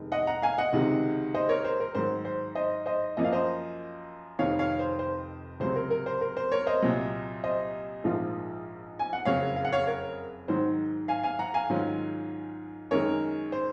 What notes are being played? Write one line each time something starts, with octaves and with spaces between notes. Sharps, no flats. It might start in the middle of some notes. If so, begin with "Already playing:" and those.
Already playing: F1 D#3 G#3
D#5 F#5
F#5 A#5
F5 G#5
D#5 F#5
C#2 C3 D#3 G#3
C5 D#5
A#4 C#5
C5
A#4
G#2 D#3 F#3 C5
C5
C5 D#5
C5 D#5
F#2 F3 A#3 D#5
F5
C5 D#5
F1 F2 D#3 C#5 F5
C#5 F5
C5
C5
C#2 C3 F#3 C5
A#4
A#4
C5
A#4
C5
A#4 C#5
C5 D#5
C2 A#2 F#3
C5 D#5
A#1 G#2 F3 A#3 F4
G#5
F#5
F#1 F2 C#3 F#3 C#5 F5
F5
F#5
C#5 F5
A#4 C#5
G#2 D#3 F#3 C5
F5 G#5
F5 G#5
F#5 A#5
F5 G#5
G#2 D#3 F#3 C#4 F4
F#2 D#3 G#3 A#4 C#5
C5